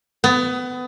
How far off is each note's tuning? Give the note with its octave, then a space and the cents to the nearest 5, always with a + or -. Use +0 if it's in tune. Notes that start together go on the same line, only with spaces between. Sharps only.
B3 +25